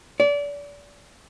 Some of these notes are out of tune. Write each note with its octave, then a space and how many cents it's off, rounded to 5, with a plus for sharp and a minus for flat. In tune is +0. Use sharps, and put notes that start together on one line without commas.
D5 -30